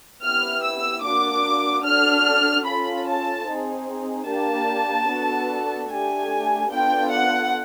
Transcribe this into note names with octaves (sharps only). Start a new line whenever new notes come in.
B3 E4 G4 F6
E6
A#3 D4 F#4 D6
D4 F#4 A4 F6
C#4 F4 A4 B5
A5
C4 D#4 G#4
A#3 D4 G4 A5
B3 D4 F#4 A4
A3 D4 G4 G#5
B3 D4 F4 A4 G5
F#5